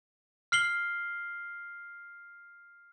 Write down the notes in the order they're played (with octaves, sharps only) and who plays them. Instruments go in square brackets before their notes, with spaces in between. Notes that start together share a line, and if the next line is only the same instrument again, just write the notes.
[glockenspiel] F6 C7 F#7 G7